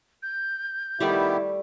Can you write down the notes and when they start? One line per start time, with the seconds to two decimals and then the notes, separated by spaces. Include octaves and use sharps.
0.23 G6
1.00 D#3 G3 A3 B3 E4 G4 D5